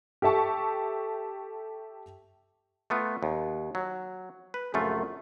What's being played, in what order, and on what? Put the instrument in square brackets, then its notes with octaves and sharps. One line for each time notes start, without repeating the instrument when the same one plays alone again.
[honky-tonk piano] G4 A4 E5 A5 C#6
[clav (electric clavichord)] A3 B3 F4
D#2
F#3
B4
A#1 F#2 C#3 A3 F4